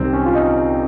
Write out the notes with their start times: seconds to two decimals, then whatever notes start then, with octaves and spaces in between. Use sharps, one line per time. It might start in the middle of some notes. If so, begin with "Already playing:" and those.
Already playing: C2 C3 D#3 C4
0.13 C#4
0.26 F4
0.35 D#4